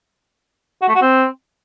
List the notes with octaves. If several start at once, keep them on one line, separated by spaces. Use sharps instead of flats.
F#4
A3
F#4
C4